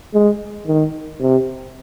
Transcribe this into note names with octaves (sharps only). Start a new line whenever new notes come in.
G#3
D#3
C3